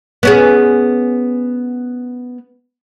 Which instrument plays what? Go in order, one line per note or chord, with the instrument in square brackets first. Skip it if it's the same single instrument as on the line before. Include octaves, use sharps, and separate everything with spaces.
[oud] B3 C#4 G#4